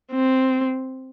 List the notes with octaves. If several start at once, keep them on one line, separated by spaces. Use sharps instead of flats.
C4